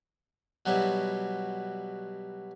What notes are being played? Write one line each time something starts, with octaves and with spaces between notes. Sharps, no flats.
B2 F#3 G3 B3 E4